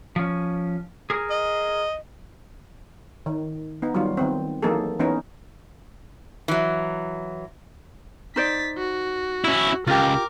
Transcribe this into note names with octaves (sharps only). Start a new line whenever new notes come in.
F3 C#4
G#4 A#4
D#5
D#3
B3 D#4
D#3 F#3 G3 F4
D#3 B3 C4
E3 F#3 A#3 D#4 G#4 A4
E3 B3 C#4 D#4
E3 F#3
D#4 C5 D5 A6 B6
F#4
C#4 E4
C#2 F4 G4 A#4 D6